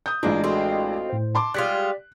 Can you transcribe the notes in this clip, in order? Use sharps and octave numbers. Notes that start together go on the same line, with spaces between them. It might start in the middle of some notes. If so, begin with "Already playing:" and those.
D#6 G6
A1 G#3 A#3 D4 F4
C4 F4 F#4 A4 D#5
A2 C5
A5 C6 D6
G3 G#3 F4 D5 F#6 B6